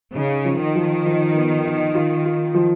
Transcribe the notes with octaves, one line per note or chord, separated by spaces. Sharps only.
C#3 D#4
F3
D#3
F3
F3
B3
D#4
F4
F4
F3